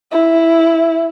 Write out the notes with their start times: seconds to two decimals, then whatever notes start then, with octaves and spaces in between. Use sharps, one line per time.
0.11 E4